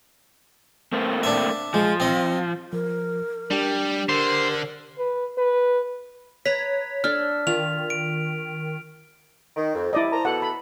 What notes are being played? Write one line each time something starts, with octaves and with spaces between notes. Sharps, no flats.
A3 A#3 C4
D4 E5
F3 G#3
C4 D#5
F3 A#4
G3 D4 G4
D3 A#4 C5
B4
B4
B4 C#5 A#5 B6
D4 A4 F6
D#3 F4 F7
D7
D#3
F2
G3 E4 D5 D#5
C5 A5 A#5
B2 A4 F#5
B5